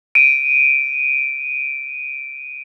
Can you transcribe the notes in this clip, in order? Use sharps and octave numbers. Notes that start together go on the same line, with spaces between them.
D7 D#7